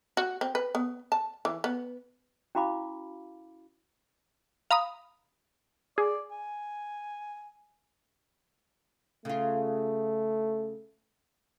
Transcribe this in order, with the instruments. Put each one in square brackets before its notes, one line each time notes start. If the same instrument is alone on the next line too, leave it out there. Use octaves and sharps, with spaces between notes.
[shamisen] F#4
C4
B4
B3
A5
E3
B3
[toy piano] C#4 E4 F#4 F5 B5 D6
[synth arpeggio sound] F5 A#5 B5 D#6
[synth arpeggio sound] G#4 [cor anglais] D5
[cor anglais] G#5
[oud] C#3 F4 [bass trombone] A3